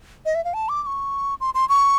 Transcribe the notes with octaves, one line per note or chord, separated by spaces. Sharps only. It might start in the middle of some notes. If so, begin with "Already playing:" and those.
D#5
E5
F5
A5
D6
D6
C#6
C6
C6
C#6